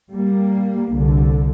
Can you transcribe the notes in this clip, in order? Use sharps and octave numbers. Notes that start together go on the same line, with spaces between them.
G3 A#3
C2 D3